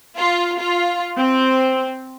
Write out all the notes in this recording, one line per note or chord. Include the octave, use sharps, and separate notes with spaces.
F4
F4
C4